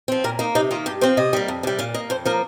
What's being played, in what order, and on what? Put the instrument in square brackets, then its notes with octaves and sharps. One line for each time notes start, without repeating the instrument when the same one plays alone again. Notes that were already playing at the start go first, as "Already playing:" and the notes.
[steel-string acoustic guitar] F3 C4
A#2 A#4
A#3 D#4
C3 D#4
D#3 A#3 F4
G2 G4
F3 C4 C5
C3 D#5
G3 A#3
F2
C3 G3
A#2 F5
A#3 D#5
F2 C5
F3 A#3 A#4